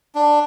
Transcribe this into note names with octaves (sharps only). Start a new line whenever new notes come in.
D4